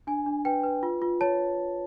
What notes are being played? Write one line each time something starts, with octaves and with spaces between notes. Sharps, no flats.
D4 G#5
D4
B4 G5
B4
F4
F4
C#5 A5